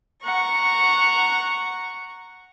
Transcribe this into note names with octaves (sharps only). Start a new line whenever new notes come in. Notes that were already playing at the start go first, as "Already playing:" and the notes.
F#5 A#5 C#6